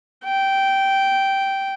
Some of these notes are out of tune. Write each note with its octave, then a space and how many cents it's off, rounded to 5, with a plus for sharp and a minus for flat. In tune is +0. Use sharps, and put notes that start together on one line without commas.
G5 -10